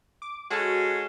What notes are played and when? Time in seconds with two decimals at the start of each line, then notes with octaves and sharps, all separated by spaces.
0.22 D6
0.50 G#3 C#4 F#4 A4